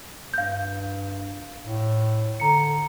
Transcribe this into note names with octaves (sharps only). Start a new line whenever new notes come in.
G2 F5 G6
A2
D3 A#5 C#7